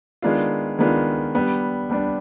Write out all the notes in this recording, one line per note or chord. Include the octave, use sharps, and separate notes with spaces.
D#3 G#3 B3 D4 F4
D#3 G#3 B3 D4 F4
G3 B3 D4
G3 B3 D4